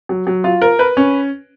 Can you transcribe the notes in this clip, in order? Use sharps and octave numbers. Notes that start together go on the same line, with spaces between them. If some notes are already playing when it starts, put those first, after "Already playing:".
F#3
F#3
F4
A#4
B4
C#4